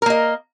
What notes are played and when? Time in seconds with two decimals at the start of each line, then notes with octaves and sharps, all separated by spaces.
0.02 A#4
0.06 A#3
0.10 D#5